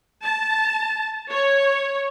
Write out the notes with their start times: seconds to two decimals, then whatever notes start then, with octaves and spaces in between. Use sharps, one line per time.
0.23 A5
1.32 C#5